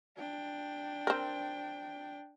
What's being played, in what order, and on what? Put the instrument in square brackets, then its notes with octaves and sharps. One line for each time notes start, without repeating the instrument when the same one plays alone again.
[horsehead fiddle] D4 G5
[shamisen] C4 A#4